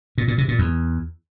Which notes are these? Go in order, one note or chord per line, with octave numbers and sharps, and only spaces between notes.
A#2
A#2
C3
A#2
E2